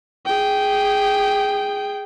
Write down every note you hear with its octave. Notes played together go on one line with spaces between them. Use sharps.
G#4 G5